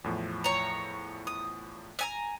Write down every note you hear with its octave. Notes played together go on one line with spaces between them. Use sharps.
E2 A2 F3
C#5 A#5
D#6
E5 G#5 A#5